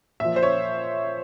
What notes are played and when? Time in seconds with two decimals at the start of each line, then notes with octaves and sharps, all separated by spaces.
0.20 A#2 F3 E5
0.36 C5
0.43 C#5